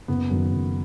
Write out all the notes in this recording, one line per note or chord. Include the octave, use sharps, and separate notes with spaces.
F#1 B3
F#2 D#3
F#1